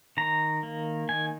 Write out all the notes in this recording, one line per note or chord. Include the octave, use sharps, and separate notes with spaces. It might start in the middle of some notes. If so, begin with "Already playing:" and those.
D#3 A#5
A#3
D#3 G#5